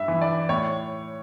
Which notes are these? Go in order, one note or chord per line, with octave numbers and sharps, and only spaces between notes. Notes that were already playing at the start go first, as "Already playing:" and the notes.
Already playing: G2 E5
E3
D5
A2 C#5